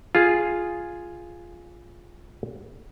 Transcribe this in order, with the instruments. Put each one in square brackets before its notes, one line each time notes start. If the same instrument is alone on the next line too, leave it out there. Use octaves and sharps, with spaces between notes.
[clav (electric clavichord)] F4 G#4